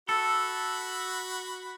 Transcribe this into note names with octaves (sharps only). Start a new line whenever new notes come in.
F#4 A4 B5